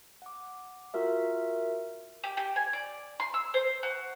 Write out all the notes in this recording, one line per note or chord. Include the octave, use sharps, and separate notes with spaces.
F#5 D6
F4 F#4 A#4 E5
G4
G4
G#5
D5
C6
E6
C5
F#4